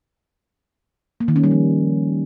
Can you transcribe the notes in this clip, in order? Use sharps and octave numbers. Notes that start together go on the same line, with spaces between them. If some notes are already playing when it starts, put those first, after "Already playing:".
A#3
D#3
C#4
G3
F3